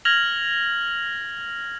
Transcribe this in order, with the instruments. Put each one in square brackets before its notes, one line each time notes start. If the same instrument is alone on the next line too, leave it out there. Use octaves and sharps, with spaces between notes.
[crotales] F6 G#6 A#6 F7 F#7